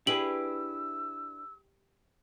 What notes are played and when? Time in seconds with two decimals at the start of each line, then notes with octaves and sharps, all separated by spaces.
0.07 D4 E4 G4 G#4 B4 E6 F#7